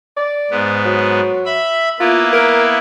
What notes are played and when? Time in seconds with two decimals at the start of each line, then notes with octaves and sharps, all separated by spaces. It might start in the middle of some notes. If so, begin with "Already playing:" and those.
0.16 D5
0.51 G#2 B3
0.85 F#3
1.45 E5 B5
2.00 A#3 B3 E4 F4
2.33 A#4